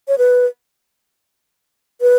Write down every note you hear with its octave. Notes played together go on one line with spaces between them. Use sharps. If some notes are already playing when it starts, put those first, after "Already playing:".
C#5
B4
B4